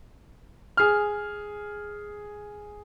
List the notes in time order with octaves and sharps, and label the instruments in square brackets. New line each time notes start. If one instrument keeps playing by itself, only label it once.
[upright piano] G#4 F6